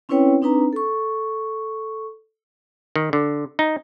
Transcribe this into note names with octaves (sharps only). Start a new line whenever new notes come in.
C4 C#4 E4 B4 C#5 G5
C4 D4 D#4 B4 A#5
A4 C#6
D#3
D3
D#4